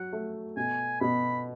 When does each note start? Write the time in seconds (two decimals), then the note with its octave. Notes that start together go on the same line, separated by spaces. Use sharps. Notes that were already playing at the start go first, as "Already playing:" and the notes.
Already playing: F#3 F#5
0.13 A3
0.57 B2 G#5
1.00 B2 B5